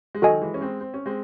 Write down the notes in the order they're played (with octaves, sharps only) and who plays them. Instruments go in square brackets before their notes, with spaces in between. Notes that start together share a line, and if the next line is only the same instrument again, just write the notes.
[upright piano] G#3
[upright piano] D#3 F#3 [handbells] F#4 A4 D#5 G#5
[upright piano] E3 G#3
C#4
G#3 C4
C4
C#4
G#3 C4